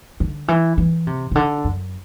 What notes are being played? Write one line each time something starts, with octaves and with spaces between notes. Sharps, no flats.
D3
E3
E3
C3
C3
D3
F#2